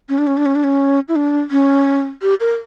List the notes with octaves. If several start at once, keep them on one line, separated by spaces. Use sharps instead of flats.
C#4
D4
C#4
D4
C#4
D4
C#4
E4
D4
C#4
G4
A#4